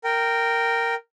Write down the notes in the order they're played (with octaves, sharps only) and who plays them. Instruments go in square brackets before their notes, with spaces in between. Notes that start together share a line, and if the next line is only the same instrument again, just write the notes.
[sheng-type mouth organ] A#4 G5